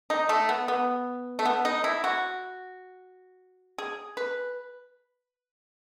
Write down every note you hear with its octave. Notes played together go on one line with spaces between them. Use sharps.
D#4
A3
B3
B3
A3
B3
D#4
E4
F#4
G#4
B4